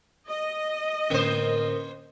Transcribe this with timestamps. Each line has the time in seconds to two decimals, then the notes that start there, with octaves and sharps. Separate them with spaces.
0.30 D#5
1.10 A2 D3 A#3 C#4 A#4 C5